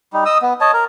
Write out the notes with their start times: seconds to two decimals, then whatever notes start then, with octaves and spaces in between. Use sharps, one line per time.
0.13 G3 D#4
0.25 D#5 D#6 E6
0.42 B3
0.61 C#5 D#5 A5
0.73 A#4